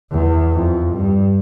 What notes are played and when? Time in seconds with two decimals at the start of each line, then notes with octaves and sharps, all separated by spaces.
0.11 E2
0.53 F2
0.94 G2